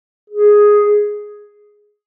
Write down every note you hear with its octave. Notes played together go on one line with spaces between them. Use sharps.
G#4